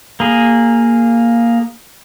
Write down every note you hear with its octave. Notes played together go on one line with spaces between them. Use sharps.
A#3 G#4